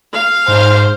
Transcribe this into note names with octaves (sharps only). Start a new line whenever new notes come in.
F5
G#2 C5